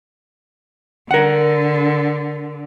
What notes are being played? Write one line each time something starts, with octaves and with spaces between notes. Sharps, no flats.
D3 A#4 F#5